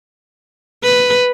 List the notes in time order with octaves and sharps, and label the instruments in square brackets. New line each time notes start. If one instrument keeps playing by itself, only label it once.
[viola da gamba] B4